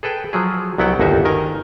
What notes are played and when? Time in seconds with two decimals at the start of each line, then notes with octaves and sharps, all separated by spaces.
0.03 G#4 A4 B4 G5
0.33 F3 F#3 G#4
0.78 C2 F#3 B3 E4 F#5 G5
0.99 G1 D#2 D#4 F#4 C5 E5
1.25 D#3 A#4 D#5 G#5 A#5